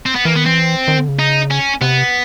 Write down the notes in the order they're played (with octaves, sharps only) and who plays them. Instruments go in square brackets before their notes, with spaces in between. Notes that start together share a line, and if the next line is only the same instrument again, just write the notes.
[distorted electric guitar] C4
B3
[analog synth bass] E3 [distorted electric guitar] A#3
[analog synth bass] D#3 [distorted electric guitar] B3
[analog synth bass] E3 [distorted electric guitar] C4
[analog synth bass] D#3
D3
C#3
[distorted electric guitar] D#4
C#4
[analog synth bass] C3 [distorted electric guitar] B3